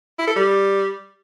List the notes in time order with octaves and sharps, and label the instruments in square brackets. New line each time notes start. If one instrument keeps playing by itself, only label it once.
[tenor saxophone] E4
A4
G3